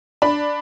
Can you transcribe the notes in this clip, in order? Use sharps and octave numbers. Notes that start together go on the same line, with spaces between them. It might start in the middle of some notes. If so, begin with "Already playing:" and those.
D4 B5